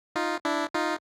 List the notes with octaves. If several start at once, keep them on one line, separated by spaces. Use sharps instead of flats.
D#4 F4
D4 E4
D#4 F4